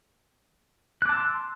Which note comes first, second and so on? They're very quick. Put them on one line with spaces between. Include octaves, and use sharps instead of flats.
F#6 D6 A5 E6 C6